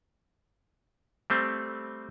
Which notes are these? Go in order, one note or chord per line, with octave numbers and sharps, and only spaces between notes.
G3 A3 C4